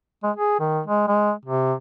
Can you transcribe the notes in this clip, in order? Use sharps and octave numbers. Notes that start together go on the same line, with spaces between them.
G#3
G#4
D#3
G#3
G#3
C3